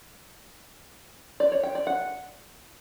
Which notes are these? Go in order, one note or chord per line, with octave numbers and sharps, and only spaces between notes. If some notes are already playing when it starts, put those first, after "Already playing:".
D5
C#5
G5
D5
F#5